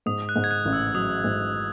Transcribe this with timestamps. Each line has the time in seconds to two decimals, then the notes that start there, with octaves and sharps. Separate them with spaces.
0.06 G#2 D#6
0.29 F#6
0.36 G#2
0.44 G#6
0.51 F#6
0.65 A1
0.73 E6
0.94 F#3 D#6
1.24 G#2